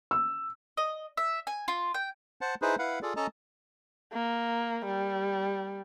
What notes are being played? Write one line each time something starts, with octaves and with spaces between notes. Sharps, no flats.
E6
D#5
E5
G#5
F4
G5
C5 F#5 A5
D#4 E4 G#4 B4 C5
E4 B4 F5 F#5
F4 G#4 A4 D5
C#4 A4 D#5 A5 A#5
A#3
G3